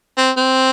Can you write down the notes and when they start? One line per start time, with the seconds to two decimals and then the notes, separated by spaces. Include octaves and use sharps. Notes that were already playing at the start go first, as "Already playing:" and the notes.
0.18 C4
0.37 C4